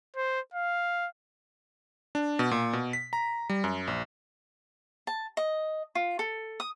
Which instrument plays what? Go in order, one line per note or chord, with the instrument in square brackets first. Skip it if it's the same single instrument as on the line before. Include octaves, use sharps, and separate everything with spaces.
[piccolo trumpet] C5
F5
[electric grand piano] D4
B2
A#2
B2
B6
A#5
G3
F#2
A#1
[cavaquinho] A5
D#5
F4
A4
D#6